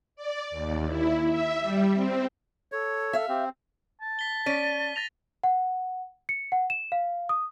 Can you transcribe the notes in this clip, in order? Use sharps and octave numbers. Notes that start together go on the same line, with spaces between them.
D5
D#2
E4
E5
G3
C4
A4 C#5
E5 F5
C4 G4
A5
B6 G7
C#4 D5 B6 D#7
A6 A#6 F7
F#5
C#7
F#5
E7
F5
D#6